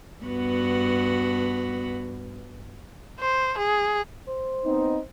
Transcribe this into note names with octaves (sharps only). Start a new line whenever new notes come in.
G2 B3 F#4
C5
G#4
C5
B3 C4 D#4